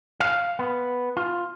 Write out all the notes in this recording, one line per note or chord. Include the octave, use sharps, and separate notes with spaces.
F5
B3
F4